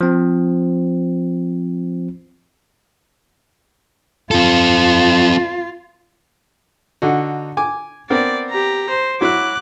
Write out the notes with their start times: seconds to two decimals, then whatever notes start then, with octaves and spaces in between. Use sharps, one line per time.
0.01 F3 C4
4.31 C4 F4 A4
7.02 D3 D#4 F#4
7.57 G#5 D6
8.10 B3 C4 A#4 D5
8.50 G4 A#5
8.89 C5
9.21 F#3 E4 F#4 D6 F#6